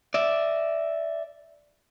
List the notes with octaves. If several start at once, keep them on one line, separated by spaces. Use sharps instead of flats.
D5 E5